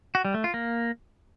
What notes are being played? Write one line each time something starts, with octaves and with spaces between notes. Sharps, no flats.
F#4
G3
A3
F4
A#3